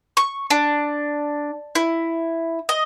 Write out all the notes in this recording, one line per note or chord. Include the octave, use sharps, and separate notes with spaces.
C#6
D4
E4
D#5